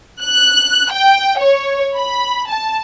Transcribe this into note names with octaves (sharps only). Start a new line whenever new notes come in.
F#6
G5
C#5
B5
A5